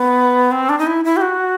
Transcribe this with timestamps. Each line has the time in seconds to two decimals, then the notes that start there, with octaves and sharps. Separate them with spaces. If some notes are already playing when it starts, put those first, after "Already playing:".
Already playing: B3
0.51 C4
0.69 D4
0.79 D#4
0.87 E4
1.05 E4
1.17 G4
1.21 F#4